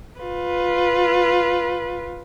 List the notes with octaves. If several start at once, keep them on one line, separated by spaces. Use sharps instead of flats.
F4 B4